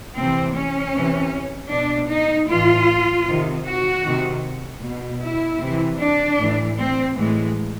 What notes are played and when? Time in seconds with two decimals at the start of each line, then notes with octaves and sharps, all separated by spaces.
0.16 C3 E3 C4
0.54 C#4
0.93 C3 E3
1.71 B2 D4
2.10 D#4
2.49 A2 E3 F4
3.27 C3 D#3
3.65 F#4
4.05 C3 D#3
4.83 B2
5.22 E4
5.59 C3 E3
5.99 D4
6.38 A2 E3
6.77 C4
7.16 A2 E3 G#3